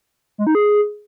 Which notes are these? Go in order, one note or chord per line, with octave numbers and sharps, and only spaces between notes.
G#3
D#4
G#4